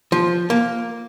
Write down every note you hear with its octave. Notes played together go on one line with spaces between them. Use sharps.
F3
A#3